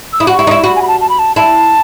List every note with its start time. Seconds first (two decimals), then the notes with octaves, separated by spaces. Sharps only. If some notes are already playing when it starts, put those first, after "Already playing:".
0.13 E6
0.20 E4 D#6
0.27 F#4 C#6
0.39 E4
0.47 D#4
0.51 E4
0.64 F#4 B5
0.76 G#5
0.82 B5
0.88 A5
1.01 A5
1.09 B5
1.19 A5
1.36 E4 A5